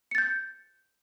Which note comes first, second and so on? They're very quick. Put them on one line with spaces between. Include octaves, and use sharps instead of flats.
C#7 A6 G6